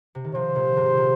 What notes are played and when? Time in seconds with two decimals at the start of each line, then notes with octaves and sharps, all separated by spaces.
0.15 C3
0.24 D#3
0.35 C3 F3 C5
0.55 A#2 D#3
0.76 G#2 C3
0.97 A#2 D#3